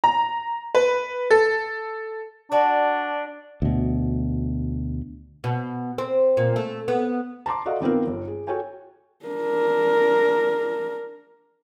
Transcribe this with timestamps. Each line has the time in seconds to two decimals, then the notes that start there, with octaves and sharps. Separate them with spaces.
0.04 A#5
0.75 B4
1.31 A4
2.52 D4 F#4 D5 A5
3.62 D2 B2
5.44 B2
5.98 C4
6.37 A#2
6.56 A3
6.88 B3
7.46 A5 A#5 C6 D6
7.66 F#4 A4 D5 D#5 F5 F#5
7.80 D#3 B3 C4 F4 A#4
8.07 G1
8.28 G#4
8.47 F#4 A4 C#5 G5 G#5
9.25 D4 A#4